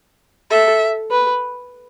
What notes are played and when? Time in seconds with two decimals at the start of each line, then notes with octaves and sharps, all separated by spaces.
0.51 A4 E5
1.11 B4